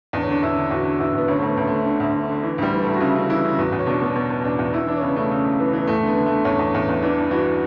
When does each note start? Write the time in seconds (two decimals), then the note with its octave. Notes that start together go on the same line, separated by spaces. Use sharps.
0.13 E2 D4
0.22 C#4
0.28 D3 D4
0.43 E2 E4
0.56 D3
0.71 E2 F#4
0.85 D3
1.00 E2 E4
1.14 E2 B3
1.28 D2 C#4
1.38 D2 A3
1.48 B3
1.57 D2
1.67 D3 A3
1.86 D3
2.00 D2
2.14 D3
2.29 D3
2.43 E3
2.58 D2 G3
2.72 E3
2.82 D2 A3
2.94 F#4
3.00 C#3 E4
3.15 C#3
3.29 E3 E4
3.44 C#3
3.58 E2 F#4
3.72 E2
3.79 C#4
3.86 B2 D4
4.02 B2
4.15 B2
4.30 B2
4.44 E2 D4
4.59 E2
4.72 E3 E4
4.87 E3 D4
4.97 C#4
5.01 C#3 B3
5.16 C#3 A3
5.30 C#3 A3
5.45 C#2
5.59 E3 B3
5.73 E3
5.87 E2 A3
6.03 D3 B3
6.17 D3
6.26 A3
6.32 D3
6.45 E2 C#4
6.59 E2
6.74 E2
6.89 E2
7.02 E3 D4
7.18 G2
7.31 E3 F#4